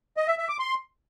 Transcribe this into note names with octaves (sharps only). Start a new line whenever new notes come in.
D#5
E5
E5
D6
C6